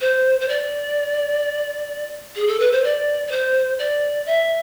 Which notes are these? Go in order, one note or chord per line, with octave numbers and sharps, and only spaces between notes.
C5
C5
D5
G#4
A4
B4
C5
D5
D5
C5
D5
E5